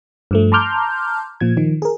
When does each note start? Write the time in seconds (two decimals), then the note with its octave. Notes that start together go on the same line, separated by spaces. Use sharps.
0.31 G2 F3 A3
0.52 A5 A#5 C6 D6 F6 G6
1.41 A#2 F3 G#6
1.57 D#3 F3
1.82 G#4 A#4